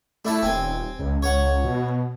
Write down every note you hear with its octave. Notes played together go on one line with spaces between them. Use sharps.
A3 D4 E4 A5
D#1 C4 G#5
C#2
C#2 C#5 F#5
B2